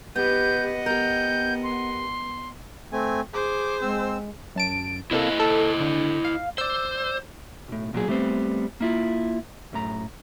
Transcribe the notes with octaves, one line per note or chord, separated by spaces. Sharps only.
B3 G4 B4 D#5 F#5 G6
B3 G4 A#4 G6
C6
A3 C4 G#5
G#4 C5 D6
G#3 C4 E6
F#2 A5 D7
C3 A#3 E4 A4 C5 D#5
A4
D3
F5
C5 D5 E6
B1 A2
B1 A#2 F#3 G#4
G3 A3 B3 C4 C5
A#3 E4 F4
F#2 A2 A#5